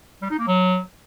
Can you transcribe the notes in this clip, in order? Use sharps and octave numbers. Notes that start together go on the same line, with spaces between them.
G3
D#4
A#3
F#3